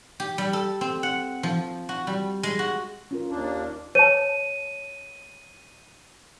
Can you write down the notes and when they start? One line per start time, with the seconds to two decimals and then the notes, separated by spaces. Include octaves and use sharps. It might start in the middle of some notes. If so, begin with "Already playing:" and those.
0.20 G4
0.38 G3
0.53 A4
0.81 C4
1.03 F#5
1.43 F3
1.89 F#4
2.07 G3
2.43 G#3
2.59 F#4
3.11 C#4 F4 A#4
3.31 D#2 A#3 D4
3.95 C#5 A5 D#7